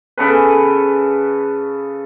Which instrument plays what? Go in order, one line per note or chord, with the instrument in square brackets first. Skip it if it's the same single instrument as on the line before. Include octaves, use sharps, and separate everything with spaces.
[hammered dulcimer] C#3 A4 B4